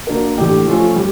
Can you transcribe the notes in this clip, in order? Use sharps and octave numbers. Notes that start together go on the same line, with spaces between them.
A#3 D4 F#4 A#4
A2 E3 A3 D4 G4
F3 A3 C#4 F4
G3